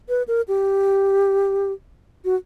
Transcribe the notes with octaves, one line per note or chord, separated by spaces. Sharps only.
B4
A#4
G4
F#4